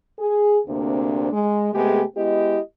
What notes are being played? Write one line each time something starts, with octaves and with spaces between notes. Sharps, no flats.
G#4
D2 C3 A#3 C4 D4
G#3
C3 G#3 A3 B3 G4 G#4
G#3 B3 E4 G4 D#5